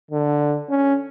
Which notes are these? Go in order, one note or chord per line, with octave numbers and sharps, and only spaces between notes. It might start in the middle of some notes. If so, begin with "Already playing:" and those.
D3
C#4